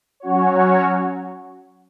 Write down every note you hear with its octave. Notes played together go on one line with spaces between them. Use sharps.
F#3 C#4 F#4 C#5